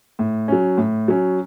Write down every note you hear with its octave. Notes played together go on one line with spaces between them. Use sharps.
A2
F#3 C#4
A2
F#3 C#4